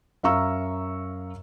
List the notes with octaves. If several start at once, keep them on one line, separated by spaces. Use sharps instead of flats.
F#2 E5 F5 A#5 C#6 E6